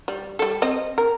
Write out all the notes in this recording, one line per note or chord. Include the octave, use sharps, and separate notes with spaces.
G3
G3 A4
C4 D#5
A#4